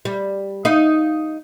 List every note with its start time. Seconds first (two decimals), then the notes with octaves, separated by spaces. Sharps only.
0.05 G3
0.65 D#4 F5